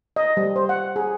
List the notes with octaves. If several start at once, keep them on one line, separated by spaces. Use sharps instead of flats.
D#5
G3
C5
F#5
G#4